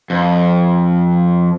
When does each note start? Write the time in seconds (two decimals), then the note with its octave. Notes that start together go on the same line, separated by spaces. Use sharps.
0.10 F2